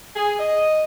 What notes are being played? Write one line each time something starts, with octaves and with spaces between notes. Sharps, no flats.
G#4
D#5